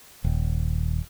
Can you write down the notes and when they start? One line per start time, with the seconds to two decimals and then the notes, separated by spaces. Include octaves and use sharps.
0.24 D#1